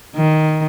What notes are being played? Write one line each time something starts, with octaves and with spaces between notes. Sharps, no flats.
D#3